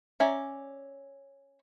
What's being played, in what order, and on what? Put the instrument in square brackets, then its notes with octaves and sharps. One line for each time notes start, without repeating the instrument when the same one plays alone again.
[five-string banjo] C#4 D5 E5 G#5 A#5